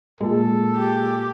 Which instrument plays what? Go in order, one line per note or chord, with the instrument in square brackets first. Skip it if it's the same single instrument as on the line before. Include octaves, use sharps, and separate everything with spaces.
[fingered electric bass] A#2 [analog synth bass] G#3 [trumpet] A4
[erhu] G4